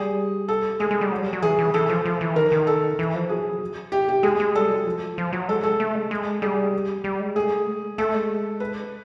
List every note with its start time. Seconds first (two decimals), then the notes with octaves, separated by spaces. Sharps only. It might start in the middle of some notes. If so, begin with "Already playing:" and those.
Already playing: G3 G#4
0.48 A4
0.80 G#3 G#4
0.91 G#3
1.01 G3
1.12 F#3
1.22 G3
1.33 F#3
1.42 E3 G#4
1.58 E3
1.74 E3 A4
1.89 F3
2.05 F3
2.21 E3
2.36 D#3 A#4
2.52 D#3
2.67 A4
2.99 E3
3.15 F3
3.29 F#3 G#4
3.92 G4
4.09 G4
4.23 G#3 G#4
4.40 G#3
4.55 G3 A4
4.70 F#3
4.86 F3
5.18 F3
5.33 F#3
5.48 G#3 A4
5.63 A4
5.80 A3
5.95 G#3
6.11 G#3
6.42 G3 G#4
7.04 G3
7.20 G#3
7.36 A3 G#4
7.67 G#3
7.98 A3 A4
8.14 G#3
8.60 B4